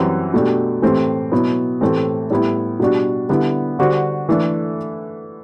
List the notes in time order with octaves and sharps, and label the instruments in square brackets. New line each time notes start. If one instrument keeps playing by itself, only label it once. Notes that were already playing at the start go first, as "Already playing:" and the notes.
Already playing: [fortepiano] F#2 E3 G3 C4
B2 A3 D4 G4
A2 E3 A3 C4 G4
B2 F#3 B3 E4
A2 E3 A3 C4 G4
A2 G3 B3 E4
B2 G3 D4 F#4
D3 G3 B3 E4
D3 G3 D4 F#4 C5
E3 A3 D4 A4